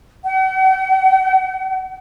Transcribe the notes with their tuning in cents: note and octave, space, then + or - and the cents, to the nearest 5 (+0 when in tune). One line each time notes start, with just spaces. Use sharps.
F#5 +45